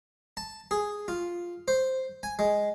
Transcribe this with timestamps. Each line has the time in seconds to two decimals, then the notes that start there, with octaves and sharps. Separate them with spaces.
0.37 A5
0.71 G#4
1.08 F4
1.68 C5
2.23 G#5
2.39 G#3